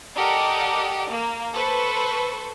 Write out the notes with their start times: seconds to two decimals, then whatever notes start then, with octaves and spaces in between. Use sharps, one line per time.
0.17 G4 A4 A#4 D5 D#5 F#5
1.11 A#3
1.55 A4 B4 C5 C#6